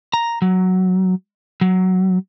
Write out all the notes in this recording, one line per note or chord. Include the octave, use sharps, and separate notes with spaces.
A#5
F#3
F#3